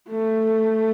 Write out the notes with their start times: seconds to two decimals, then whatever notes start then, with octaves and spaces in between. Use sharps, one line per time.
0.09 A3